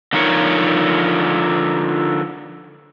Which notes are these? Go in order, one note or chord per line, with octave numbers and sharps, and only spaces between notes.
D3 F3 D#4 A#4 C#5